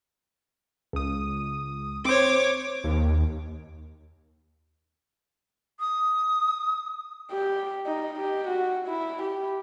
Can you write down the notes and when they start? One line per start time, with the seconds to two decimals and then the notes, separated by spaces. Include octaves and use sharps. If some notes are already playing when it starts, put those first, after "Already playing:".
0.93 C#2 D#6
2.05 C4 C5 C#5 D6
2.84 D#2
5.80 D#6
7.31 G4
7.86 D#4
8.19 G4
8.47 F#4
8.87 E4
9.22 G4